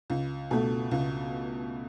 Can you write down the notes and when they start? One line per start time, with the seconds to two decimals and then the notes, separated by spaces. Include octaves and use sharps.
0.10 C#2
0.51 B2 A3
0.91 C#2